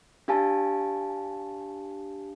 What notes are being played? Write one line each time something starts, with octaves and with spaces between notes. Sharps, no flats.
D4 G4 F5 G#5 A5